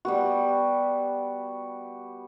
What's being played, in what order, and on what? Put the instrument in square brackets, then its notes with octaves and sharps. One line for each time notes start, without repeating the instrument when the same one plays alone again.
[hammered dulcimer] G3 B3 F#4